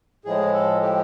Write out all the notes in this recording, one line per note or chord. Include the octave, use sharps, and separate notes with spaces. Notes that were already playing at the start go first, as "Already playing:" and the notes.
A2 F3 G#3 G#4
A4
G4